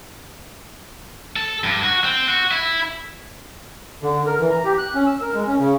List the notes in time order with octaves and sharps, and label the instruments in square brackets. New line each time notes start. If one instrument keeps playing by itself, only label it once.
[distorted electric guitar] A4
G2
F#4
C4
F#4
E4
[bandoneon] D3
A#4
E3
A#5
G4
F#6
C#4
E6
A#4
G#3
C#4
C#3